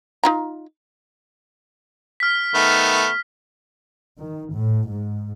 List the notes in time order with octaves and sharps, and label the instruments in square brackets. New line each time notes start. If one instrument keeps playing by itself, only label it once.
[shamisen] D#4 F4 A#5
[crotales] F6 B6
[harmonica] D#3 A3 B3
[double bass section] D#3
A2
G#2